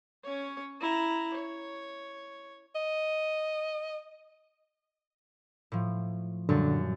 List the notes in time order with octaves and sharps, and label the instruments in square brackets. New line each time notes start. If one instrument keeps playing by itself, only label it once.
[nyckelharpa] C#4 C#5
E4 A#5
C#5
[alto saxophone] D#5
[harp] A2 F3
[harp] F#2 A#2 G3 [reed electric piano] D3